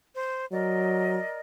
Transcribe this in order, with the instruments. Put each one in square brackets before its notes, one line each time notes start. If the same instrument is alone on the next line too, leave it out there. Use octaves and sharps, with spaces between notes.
[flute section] C5
[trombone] F#3 [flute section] A#4 D5 D#5